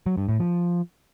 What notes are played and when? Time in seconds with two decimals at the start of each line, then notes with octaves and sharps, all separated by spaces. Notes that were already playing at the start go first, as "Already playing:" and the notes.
0.06 F#3
0.18 G2
0.29 A2
0.40 F3